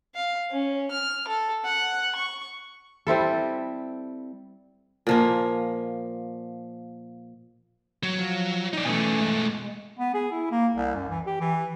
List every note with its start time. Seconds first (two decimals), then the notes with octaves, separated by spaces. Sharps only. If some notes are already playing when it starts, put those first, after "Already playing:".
0.15 F5
0.51 C#4
0.91 F6
1.28 A4
1.65 F#5
2.15 C#6
3.07 G3 C4 E4 A4
5.07 A#2 F3 A#3
8.03 F#3
8.18 F3
8.73 D#4 D5
8.85 B2 E3 A3 C#4 G#5
9.22 G#3
9.99 B3
10.14 G#4
10.32 E4
10.51 A#3
10.75 C2
10.95 F#2
11.09 E3
11.26 G4
11.40 E3